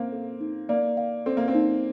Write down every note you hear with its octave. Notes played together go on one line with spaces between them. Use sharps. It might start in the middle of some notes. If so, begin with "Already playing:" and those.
Already playing: A#3 C4 F5
A4
D#4
A#3 D5
F5
C4 A4
A#3
C4
D#4